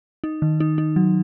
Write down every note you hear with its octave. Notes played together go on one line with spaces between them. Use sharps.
D#4
D#3
D#4
D#4
F#3